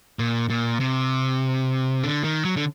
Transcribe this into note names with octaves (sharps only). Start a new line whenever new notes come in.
A#2
A#2
C3
D3
D#3
F#3
D3